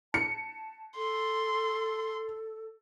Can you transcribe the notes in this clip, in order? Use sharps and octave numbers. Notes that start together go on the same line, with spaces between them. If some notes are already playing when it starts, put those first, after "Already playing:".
A5 C#7
A4 C6